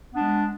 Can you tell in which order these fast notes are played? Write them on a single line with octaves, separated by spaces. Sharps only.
B3 D4 G#3